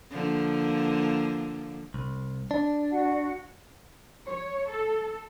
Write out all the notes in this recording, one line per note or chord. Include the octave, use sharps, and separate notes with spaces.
D3 F3 A#3
C2
D4
F#4 F#5
C#5
A4